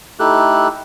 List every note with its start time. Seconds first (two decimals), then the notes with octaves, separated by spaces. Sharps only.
0.19 A3 D#4 E4 G4 A4 F#6